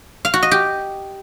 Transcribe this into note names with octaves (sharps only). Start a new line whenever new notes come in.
F5
F#4
D#5
G4